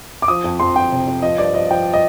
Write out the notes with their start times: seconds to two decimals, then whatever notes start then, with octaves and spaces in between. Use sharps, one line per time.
0.22 D6
0.28 F3 D#6
0.44 F2
0.60 F2 C6
0.76 F2 G5
0.92 C3
1.07 F2
1.22 F3 D#5
1.38 G2 D5
1.54 F3 D#5
1.71 F3 G5
1.93 D#5